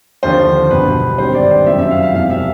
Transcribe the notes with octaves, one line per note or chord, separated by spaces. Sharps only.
D#2 D3 F3 C5
B1 B2 G3 B4
G#1 G2 D#3 G3 C5
D5
C5
F#1 F2 C#3 F#3 E5
E5
F5
F5
E1 E2 C3 F3 F5
E5